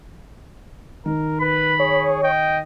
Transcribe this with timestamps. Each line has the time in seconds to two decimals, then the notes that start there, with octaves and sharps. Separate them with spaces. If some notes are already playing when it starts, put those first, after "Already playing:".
1.06 D#3 A#4
1.41 B4 B5
1.80 G#4 C#5
2.24 D#5 G5